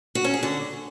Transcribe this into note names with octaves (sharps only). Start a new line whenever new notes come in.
F#4
C#4
G#4
D3